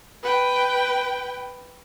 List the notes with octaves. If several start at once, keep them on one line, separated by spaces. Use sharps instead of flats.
B4 G5